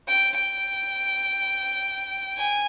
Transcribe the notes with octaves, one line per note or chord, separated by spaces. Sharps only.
G5
G5
G#5